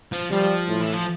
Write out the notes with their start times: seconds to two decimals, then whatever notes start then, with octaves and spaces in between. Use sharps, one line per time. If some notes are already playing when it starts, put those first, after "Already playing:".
0.12 F3
0.31 F3 G3
0.68 A2
0.81 E3
0.93 F3